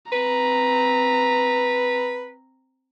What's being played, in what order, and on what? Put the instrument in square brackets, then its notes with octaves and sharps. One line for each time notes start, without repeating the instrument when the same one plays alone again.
[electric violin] C4 A#5 [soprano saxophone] B4